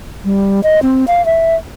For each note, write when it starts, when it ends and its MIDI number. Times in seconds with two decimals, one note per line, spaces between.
0.25 0.61 55
0.63 0.80 75
0.83 1.05 60
1.08 1.25 77
1.26 1.55 76